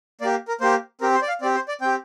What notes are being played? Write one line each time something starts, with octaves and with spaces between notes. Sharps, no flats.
A#3 G4 D5
A#4
A#3 G4 C5
C4 G4 A#4
C5
D5
F5
C4 G4 D5
C5
D5
C4 G4 G5